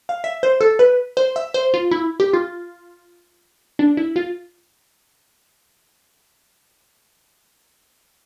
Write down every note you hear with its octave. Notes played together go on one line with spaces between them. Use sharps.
F5
E5
C5
A4
B4
C5
E5
C5
F4
E4
G4
F4
D4
E4
F4